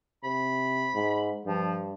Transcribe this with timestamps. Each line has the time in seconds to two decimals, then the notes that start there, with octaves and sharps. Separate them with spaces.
0.24 C3 B5
0.94 G#2
1.46 G2 F3